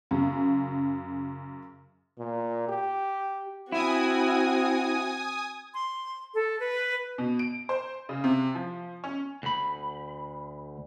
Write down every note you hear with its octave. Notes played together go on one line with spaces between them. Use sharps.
F#2 C#3
A#2
G4
C4 E4 F#4 G#5 D#6
C6
A4
B4
B2
D7
C5
C#3
C3
F3
C#4
D2 B5